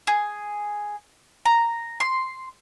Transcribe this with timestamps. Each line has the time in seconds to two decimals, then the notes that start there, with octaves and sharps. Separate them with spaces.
0.07 G#4
1.46 A#5
2.00 C6